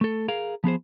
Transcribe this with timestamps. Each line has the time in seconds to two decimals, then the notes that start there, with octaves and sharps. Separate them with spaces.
0.01 A3 A4
0.28 G#4 A#4 F5
0.64 F3 B3 G#4 C5